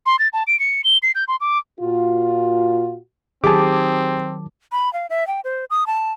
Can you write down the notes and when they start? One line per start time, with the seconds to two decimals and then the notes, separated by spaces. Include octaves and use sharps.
0.06 C6
0.19 A6
0.33 A5
0.47 D7
0.60 C#7
0.84 G7
1.03 C7
1.15 G6
1.28 C6
1.41 D6
1.80 A#2 F4 F#4
3.44 D#3 F#3 C4 G4 G#4 A5 D6
4.72 B5
4.93 F5
5.10 E5
5.27 G5
5.44 C5
5.70 D#6
5.87 A5